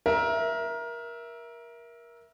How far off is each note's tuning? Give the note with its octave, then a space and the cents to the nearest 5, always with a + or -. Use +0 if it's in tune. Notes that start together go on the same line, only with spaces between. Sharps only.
A#4 +20 E5 +0